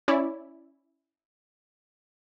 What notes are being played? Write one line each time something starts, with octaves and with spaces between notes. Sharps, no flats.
C#4 E4 C#5 D5